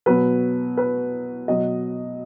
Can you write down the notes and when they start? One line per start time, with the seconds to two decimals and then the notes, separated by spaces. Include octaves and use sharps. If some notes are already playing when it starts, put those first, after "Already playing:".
0.06 B2 F#3 B4
0.77 B4
1.48 B2 F#3 D#5